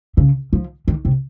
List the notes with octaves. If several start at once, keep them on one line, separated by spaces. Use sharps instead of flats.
C#3
F3
D#3
C3